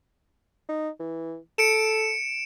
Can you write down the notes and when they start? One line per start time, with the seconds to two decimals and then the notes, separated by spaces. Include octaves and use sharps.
0.69 D#4
1.00 E3
1.58 A4 C#7 D7 E7